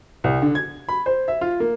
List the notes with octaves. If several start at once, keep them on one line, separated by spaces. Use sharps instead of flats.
C2
D3
G#6
B5
C5
E5
F4
A#3